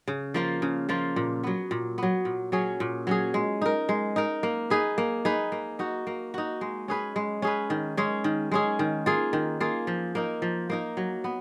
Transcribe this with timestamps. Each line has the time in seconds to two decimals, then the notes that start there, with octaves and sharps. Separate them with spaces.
0.08 C#3
0.34 F3 A#3 F4
0.62 C#3
0.89 F3 A#3 F4
1.16 A#2
1.43 F#3 B3
1.71 A#2
1.98 F#3 B3
2.25 A#2
2.52 F#3 C#4 G#4
2.80 A#2
3.07 F#3 C#4 G#4
3.34 G#3
3.62 D#4 A#4
3.89 G#3
4.16 D#4 A#4
4.43 A#3
4.70 D#4 G#4 B4
4.98 A#3
5.25 D#4 G#4 B4
5.52 A#3
5.79 D#4 F#4
6.07 A#3
6.34 D#4 F#4
6.61 G#3
6.88 C#4 G#4 B4
7.16 G#3
7.42 C#4 G#4 B4
7.70 D#3
7.97 G#3 C#4 G#4
8.24 D#3
8.51 G#3 C#4 G#4
8.79 D#3
9.06 A#3 F4 G#4
9.33 D#3
9.60 A#3 F4 G#4
9.87 F3
10.15 A#3 D#4 A#4
10.42 F3
10.70 A#3 D#4 A#4
10.97 F#3
11.24 B3